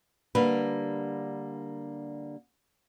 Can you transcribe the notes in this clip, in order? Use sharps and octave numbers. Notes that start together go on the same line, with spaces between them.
D3 G3 A#3 D4 A#4 B4